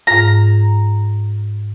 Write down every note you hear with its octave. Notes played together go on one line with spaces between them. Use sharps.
G#2 F4 A#5